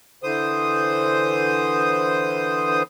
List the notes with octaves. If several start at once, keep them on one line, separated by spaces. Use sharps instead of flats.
D3 E3 C5 D#6